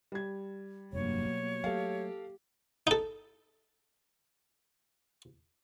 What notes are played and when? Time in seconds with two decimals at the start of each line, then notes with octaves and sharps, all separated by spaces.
0.12 G3 G#6
0.93 F1 G2 F#3 A#3 C#5
1.25 B2
1.64 F#3 A3 G4 A4 F5
2.87 D#4 A4